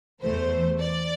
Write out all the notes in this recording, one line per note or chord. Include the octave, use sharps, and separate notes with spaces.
E2 E3 A3 C5
D5